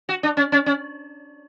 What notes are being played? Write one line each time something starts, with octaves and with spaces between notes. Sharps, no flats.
F#4
D4
C#4
C#4
C#4